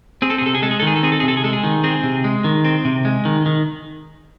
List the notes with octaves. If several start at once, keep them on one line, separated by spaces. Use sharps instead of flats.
C4 G#4
A4
G#4
C3 A4
G#4
G#3 A4
G#4
A4
D#3 G#4
A4
C4 G#4
A4
G#4
C3
A4
G#4
G#3 A4
G#4
D#3
C4 G#4
C3
G#3
D#3
C4
C3
G#3
D#3
D#3